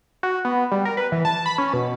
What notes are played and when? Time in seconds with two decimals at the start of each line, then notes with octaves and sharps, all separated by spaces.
0.23 F#4
0.45 B3
0.72 G3
0.85 A#4
0.97 B4
1.12 E3
1.25 A5
1.46 B5
1.58 C#4
1.73 B2